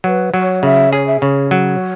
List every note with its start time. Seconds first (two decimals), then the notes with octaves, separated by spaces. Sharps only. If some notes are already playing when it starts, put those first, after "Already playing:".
0.04 F#3 B4
0.34 F#3 C#5
0.63 C#3 E5
0.92 G#4 C#5
1.07 E5
1.20 C#3 C#5
1.51 F#3